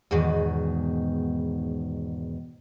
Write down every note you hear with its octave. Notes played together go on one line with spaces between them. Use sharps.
E2 G#2 B2 D#3